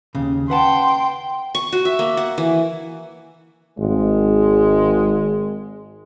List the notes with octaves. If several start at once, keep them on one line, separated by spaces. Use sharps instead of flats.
D#2 C#3
B4 F#5 G5 A5 C6
C#6
F#4
E5
A#3
F#5
E3
G#1 G#3